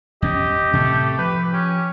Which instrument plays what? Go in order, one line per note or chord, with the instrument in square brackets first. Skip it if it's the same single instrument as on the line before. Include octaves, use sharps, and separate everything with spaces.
[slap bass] E2 C#4 [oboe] G4 [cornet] D#5
[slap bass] A2 C3 [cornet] A3
[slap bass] F3 [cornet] B4
[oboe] C#4 [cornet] G4